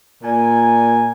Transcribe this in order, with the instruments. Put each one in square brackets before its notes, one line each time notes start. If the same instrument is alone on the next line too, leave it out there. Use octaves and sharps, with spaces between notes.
[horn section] A#2 G#5